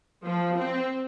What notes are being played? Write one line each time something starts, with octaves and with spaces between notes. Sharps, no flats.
F3
C4